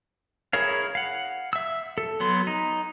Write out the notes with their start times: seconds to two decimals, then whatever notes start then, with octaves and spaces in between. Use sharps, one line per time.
0.53 E4 G#4 A#4 C#5 F5
0.95 F5 F#5
1.53 E5 E6
1.98 A4
2.20 F#3 B3 C6
2.47 D#4